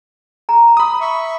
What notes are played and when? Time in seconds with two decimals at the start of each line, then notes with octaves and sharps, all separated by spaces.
0.49 A#5
0.77 B5 D#6
1.01 E5 C#6